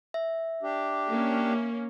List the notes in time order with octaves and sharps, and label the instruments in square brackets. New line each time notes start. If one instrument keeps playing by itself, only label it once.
[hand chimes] E5
[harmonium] D4 G4
[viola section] A#3 C#4